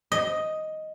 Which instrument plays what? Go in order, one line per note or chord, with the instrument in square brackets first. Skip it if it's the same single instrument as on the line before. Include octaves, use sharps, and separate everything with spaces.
[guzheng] D#5